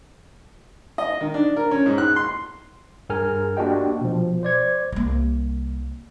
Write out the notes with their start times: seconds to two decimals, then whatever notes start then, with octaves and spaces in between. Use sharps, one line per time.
0.98 D#5
1.21 D#3
1.34 D4
1.56 A#4
1.71 C#4
1.86 G#2
1.98 F#6
2.16 C6
3.09 G2 G#4 A#4 G#5 F6
3.57 A#3 D4 F#4 G4 D#5 G5
4.01 B2 F3
4.43 C5 D5 G#6
4.92 C2 A#3